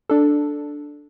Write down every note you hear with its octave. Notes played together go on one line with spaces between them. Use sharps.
D4 A4